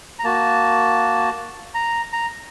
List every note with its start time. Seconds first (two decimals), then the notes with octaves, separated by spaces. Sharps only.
0.19 A#5
0.24 A#3 F#4 A5
1.74 A#5
2.13 A#5